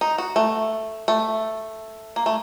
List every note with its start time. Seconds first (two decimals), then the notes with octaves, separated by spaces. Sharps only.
0.01 D#4
0.18 F#4
0.36 A3
1.08 A3
2.16 A#3
2.26 A3